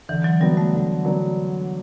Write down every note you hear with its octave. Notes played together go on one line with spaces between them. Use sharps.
D3 E3
F#3
F#3 G3 B3 D4
A3
D3
F#3 B3 D4